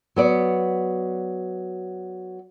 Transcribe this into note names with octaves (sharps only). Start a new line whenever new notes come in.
F#3 B3 D5